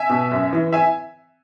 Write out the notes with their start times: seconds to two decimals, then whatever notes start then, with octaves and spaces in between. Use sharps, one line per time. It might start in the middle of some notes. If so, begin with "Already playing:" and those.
Already playing: E5 G#5
0.10 B2
0.32 F#2
0.53 E3
0.73 E5 G#5